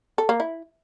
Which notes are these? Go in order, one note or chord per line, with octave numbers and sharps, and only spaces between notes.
A4
A#3
E4